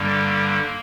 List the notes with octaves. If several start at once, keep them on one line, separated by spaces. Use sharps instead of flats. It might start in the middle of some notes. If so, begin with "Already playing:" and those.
Already playing: G2 D3 G3 A#3